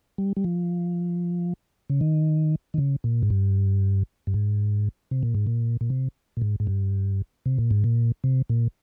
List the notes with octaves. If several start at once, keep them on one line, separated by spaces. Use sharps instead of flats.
G3
G3
F3
C#3
D#3
D#3
C#3
A#2
G#2
G2
G2
G#2
C3
A#2
G#2
A#2
A#2
C3
A#2
G#2
G#2
G2
C3
A#2
G#2
A#2
C3
A#2